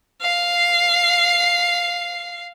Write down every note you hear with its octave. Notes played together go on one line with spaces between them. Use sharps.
F5 C7